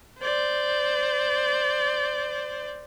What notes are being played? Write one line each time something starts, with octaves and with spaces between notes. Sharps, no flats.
C5 D5